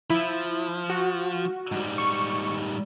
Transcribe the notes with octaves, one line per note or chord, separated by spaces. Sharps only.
F3 E4
F#4
G#2 G3
C#6